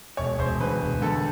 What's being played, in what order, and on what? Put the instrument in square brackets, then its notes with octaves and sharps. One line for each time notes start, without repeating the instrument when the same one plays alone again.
[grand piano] E1 C#5
E1 C5
D2 B4
E1
D2 A4